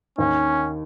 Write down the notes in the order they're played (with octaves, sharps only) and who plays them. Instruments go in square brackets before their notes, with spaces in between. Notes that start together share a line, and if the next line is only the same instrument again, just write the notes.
[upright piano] D#2 D#3 [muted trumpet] C#4